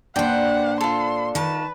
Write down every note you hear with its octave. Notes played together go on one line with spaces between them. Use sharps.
A#2 D4 B4 C5 F#5 G5
F4 A4 C6
D#3 B4 A5